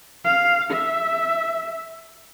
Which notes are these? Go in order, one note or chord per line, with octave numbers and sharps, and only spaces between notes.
F5
E5